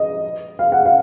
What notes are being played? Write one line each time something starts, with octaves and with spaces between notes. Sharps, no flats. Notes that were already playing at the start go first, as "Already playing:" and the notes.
Already playing: D#5
F5
F#5
F5